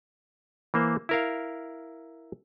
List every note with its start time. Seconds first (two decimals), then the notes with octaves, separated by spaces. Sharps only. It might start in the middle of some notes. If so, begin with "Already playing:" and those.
0.74 E3 A#3 C5
1.09 E4 A#4 F5